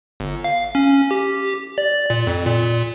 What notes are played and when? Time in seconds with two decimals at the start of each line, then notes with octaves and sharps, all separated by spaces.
0.20 G1
0.44 F5
0.75 C#4
1.11 G4
1.78 D5
2.10 A#2
2.27 F2
2.46 A#2